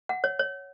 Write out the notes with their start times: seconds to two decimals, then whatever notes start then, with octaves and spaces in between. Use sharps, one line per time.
0.09 F#5
0.24 C#5
0.39 C#5